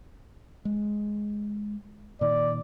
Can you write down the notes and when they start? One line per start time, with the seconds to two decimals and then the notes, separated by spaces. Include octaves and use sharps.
0.65 G#3
2.21 A#2 D#3 D5